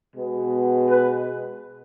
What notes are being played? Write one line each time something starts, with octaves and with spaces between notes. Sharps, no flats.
B2 G#3 B3
B4